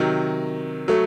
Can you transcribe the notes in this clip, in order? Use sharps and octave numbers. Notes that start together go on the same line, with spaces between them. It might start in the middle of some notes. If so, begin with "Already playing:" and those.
Already playing: C3 D#3 F#3
F#3 A3